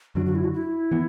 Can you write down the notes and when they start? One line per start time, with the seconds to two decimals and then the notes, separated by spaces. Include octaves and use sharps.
0.15 F#2 D3 F#3 D4 F#4
0.26 F#4
0.35 E4
0.44 F#4
0.54 E4
0.91 E3 B3